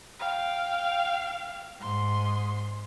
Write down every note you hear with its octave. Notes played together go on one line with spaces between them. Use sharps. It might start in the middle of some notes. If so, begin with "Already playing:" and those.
F5 G5
G#2 C6